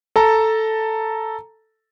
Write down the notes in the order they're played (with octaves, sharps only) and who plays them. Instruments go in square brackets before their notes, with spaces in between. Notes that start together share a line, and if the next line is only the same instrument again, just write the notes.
[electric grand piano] A4 A5 A#5